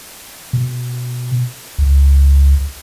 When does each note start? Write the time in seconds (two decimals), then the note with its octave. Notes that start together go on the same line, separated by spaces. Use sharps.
0.53 B2
1.78 C#2